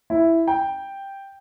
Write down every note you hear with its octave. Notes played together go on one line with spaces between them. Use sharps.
E4
G5